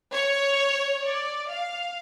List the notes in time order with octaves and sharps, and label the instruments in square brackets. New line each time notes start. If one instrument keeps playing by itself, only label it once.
[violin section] C#5
D5
F5